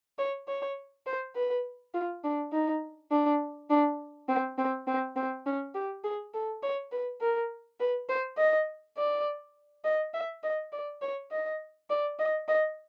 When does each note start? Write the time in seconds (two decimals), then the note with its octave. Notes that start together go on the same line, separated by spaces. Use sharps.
0.19 C#5
0.48 C#5
1.06 C5
1.35 B4
1.94 F4
2.24 D4
2.53 D#4
3.11 D4
3.70 D4
4.28 C4
4.58 C4
4.87 C4
5.16 C4
5.46 C#4
5.75 G4
6.04 G#4
6.34 A4
6.63 C#5
6.92 B4
7.21 A#4
7.80 B4
8.09 C5
8.38 D#5
8.97 D5
9.84 D#5
10.14 E5
10.43 D#5
10.72 D5
11.02 C#5
11.31 D#5
11.90 D5
12.19 D#5
12.48 D#5